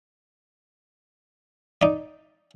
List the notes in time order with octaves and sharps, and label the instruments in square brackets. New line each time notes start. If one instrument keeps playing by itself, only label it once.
[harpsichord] D#4 D5